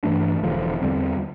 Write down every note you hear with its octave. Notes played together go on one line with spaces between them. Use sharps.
G2 E3 A3 D4
E1 E2 D3 F3
E2 D3 G3 C4